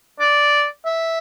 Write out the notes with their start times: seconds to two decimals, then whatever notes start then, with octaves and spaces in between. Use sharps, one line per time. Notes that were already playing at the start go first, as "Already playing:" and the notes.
0.20 D5
0.86 E5